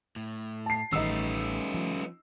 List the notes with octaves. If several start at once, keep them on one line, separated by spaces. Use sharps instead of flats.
A2
A5 C7
A1 D#3 G3 A3 C#4 D#4 B4 E6
F3